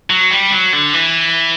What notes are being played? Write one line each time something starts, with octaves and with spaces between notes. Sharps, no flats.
F#3
G3
F#3
D3
E3